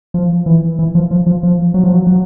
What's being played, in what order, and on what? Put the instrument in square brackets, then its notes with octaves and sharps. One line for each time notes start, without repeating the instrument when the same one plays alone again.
[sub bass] F3
E3
E3
F3
F3
F3
F3
F#3
F3
F#3
F#3